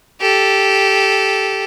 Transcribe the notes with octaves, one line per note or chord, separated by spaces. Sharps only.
G4 A4